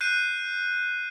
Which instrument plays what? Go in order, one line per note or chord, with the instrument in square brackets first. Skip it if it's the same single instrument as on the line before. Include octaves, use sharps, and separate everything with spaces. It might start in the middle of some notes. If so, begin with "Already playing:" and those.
[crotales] F#6 G6 C7 D#7